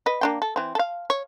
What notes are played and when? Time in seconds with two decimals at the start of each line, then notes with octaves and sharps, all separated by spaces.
0.06 B4 D#5
0.21 A#3 D4 G5
0.42 A4
0.56 E3 C4
0.75 A4 F5
1.10 C#5